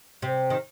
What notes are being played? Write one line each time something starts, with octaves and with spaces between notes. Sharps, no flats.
C3
D#3